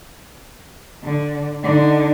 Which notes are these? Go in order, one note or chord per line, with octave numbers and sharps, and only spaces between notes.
D3
D3 D#4